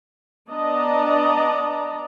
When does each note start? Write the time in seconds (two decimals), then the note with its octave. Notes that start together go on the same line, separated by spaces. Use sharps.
0.51 B3 D4 D5 D#5 A5 A#5